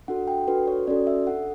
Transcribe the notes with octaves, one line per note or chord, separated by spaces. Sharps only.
D4 F#4 A4 F#5
G5
D4 F#4 A4 B4
C#5
C#4 F#4 A4 D5
E5
D4 A4 F#5